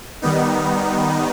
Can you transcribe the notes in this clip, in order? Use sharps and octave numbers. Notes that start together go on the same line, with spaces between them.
D#3 G3 B3 D#4